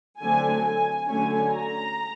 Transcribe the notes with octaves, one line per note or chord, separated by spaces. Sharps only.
D3 F#3 A3 C4 G#5
G#5
D3 F#3 A3 C#4 G#5
A#5